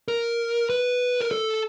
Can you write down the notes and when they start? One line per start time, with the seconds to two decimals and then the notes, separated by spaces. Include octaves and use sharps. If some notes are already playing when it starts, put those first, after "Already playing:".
0.08 A#4
0.70 B4
1.21 A#4
1.31 A4